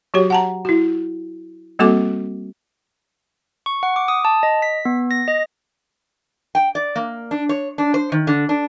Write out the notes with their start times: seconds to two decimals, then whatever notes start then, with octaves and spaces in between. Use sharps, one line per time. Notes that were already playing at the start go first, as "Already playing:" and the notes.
0.14 F#3 F#4 G4 C#5
0.30 F#5 A5 A#5
0.65 E4 F#4
1.79 G3 A#3 C4 F#4 A4 D6
3.66 C#6
3.83 F#5
3.96 D6
4.08 D#6
4.25 A5
4.43 D#5
4.62 B6
4.85 B3
5.11 A#6
5.28 D#5
6.55 G5
6.75 D5
6.96 A#3
7.31 D4
7.49 C#5
7.78 D4
7.94 C5
8.12 D#3
8.27 D3
8.49 D4